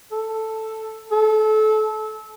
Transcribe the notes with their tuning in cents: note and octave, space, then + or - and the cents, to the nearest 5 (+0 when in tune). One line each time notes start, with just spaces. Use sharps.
A4 +5
A4 -25